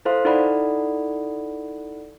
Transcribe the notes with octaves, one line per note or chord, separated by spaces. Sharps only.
E4 A4 C5 F5 C6
D#4 E4 A4 D5 F#5 B5